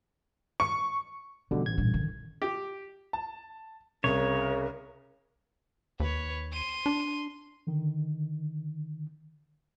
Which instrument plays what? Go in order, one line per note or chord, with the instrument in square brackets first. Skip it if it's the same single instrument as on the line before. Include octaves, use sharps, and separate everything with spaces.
[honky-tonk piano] C#6
[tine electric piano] B2 D3 G3 [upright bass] E3 D#4
[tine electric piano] A1 G#6
[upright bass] G2 A#2
D3 D#3
[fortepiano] G4
[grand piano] A5
[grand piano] C2 [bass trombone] C#3 [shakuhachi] A#4 [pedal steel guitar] C#5
[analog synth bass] D#2 [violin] B4 C#5
[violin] C6 D#7
[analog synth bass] D4
[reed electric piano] D3 D#3